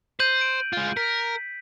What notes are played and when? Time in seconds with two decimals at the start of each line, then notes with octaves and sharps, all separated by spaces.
0.20 C5 G6 D#7 F#7
0.41 D7
0.73 G#3 F4
0.97 A#4 B6